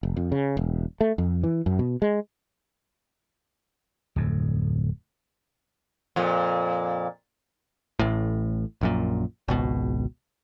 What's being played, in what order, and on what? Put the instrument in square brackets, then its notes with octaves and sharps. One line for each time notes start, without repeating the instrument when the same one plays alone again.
[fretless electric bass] F1
F2
C#3
E1
A3
F2
E3
F#2
B2
G#3
[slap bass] D1 F2
[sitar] F2 A#2
[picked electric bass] A1 A2
A#1 F#2 A#2
G#1 C#2 B2